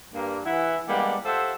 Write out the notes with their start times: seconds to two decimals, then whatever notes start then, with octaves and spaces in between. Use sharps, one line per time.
0.14 G2 A#3
0.45 E3 E4 F#5
0.88 G3 G#3 A#3 B3 D4 F#5
1.25 F4 G4 A4 C5 E5 F#5